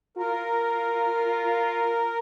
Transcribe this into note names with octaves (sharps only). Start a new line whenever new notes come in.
F4 A#4